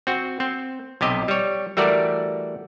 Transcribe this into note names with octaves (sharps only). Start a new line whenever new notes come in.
C4 F#4
C4
B1 C3 G4 D#5
G3 C#5
E3 G3 A3 F#4 A#4 D5